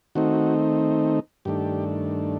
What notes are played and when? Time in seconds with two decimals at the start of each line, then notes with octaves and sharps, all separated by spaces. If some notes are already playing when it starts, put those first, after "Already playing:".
0.15 D#3 A3 C4 D#4 F#4
1.45 G2 D#3 A3 D4 G4